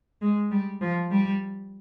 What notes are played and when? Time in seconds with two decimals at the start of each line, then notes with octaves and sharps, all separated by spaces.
0.22 G#3
0.51 G3
0.81 F3
1.11 G3